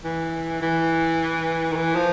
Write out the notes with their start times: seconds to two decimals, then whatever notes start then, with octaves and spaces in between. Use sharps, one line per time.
0.05 E3
0.62 E3
1.72 D#3
1.76 E3
1.96 F3